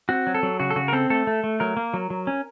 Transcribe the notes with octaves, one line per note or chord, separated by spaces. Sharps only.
C4 F#4
F#3
A4
F#3
C#3 F#4
A4
C#3 F#4
A#4
C4 A4
A3 A4
A3
A3
F#3 A#4
A#3
F#3
F#3
C#4